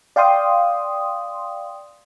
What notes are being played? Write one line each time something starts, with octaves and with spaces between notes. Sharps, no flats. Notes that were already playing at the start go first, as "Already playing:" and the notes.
D5 F5 G5 C6 D#6